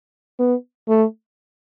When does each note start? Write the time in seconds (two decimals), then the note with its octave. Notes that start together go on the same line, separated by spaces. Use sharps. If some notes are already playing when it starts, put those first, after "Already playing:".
0.39 B3
0.89 A3